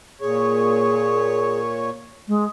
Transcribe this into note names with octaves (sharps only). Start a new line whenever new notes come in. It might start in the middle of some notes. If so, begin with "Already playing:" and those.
A#2 G#4 C#5
G#3